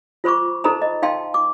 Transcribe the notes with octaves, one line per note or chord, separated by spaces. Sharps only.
F4 C5 B5 C#6 D6
D#4 A4 C5 A#5 B5
D#5
D#4 F5 G5 A5 C6
D6